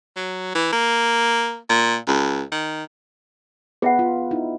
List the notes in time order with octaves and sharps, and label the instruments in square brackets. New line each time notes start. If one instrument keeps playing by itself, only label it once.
[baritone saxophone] F#3
E3
A#3
A#2
C#2
D#3
[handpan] B3 B4 [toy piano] G#4 E5 F#5
[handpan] F4
D#4 E4